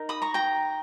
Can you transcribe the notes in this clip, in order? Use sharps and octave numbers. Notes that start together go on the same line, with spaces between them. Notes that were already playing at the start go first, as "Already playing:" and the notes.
Already playing: D#4 A#4
B5 D#6
A#5 C#6
G5 A#5